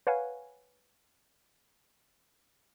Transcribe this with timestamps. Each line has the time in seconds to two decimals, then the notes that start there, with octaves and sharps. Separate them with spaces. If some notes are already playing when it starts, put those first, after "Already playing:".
0.07 B4 C#5 F5 F#5 G#5